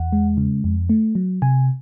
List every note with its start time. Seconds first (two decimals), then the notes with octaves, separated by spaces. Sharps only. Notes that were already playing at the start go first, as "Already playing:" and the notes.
Already playing: E2 F#5
0.12 G#3
0.37 C#3
0.64 F2
0.89 A3
1.15 F#3
1.42 C3 G#5